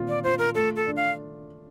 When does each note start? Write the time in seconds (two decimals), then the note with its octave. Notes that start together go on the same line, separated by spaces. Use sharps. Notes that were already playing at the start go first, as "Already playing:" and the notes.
Already playing: A#2 C4 F4
0.08 D5
0.24 F4 C5
0.39 A#4
0.55 A3 A4
0.76 A4
0.86 D4
0.96 F5